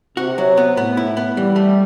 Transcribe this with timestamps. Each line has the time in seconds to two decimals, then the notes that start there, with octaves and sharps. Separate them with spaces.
0.17 C3 F#4
0.38 F#3
0.57 B3
0.77 A2 B3
0.97 E4
1.17 B3
1.37 E3 G3
1.56 A3